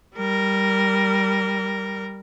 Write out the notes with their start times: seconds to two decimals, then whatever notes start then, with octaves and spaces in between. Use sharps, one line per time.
0.16 G3 A#4